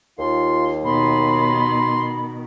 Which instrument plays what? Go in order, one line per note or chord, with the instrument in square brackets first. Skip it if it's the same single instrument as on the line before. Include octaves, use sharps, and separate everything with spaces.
[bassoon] D#2 [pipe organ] F4 C6
[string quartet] B2 D#3 [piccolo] B5 [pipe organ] C6